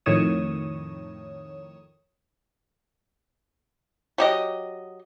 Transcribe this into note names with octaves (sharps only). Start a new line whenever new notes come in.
F2 A2 D#3 C#5 D#6 E7
F#3 G4 D#5